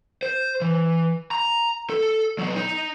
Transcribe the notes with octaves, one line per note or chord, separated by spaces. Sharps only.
C5
E3
A#5
A4
F#3 B3
D#4